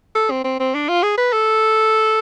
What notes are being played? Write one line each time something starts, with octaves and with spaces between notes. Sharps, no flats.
A4
C4
C4
C4
D4
F4
G#4
B4
A4